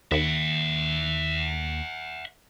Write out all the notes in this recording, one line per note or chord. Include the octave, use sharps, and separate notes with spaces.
D#2 E5 F#5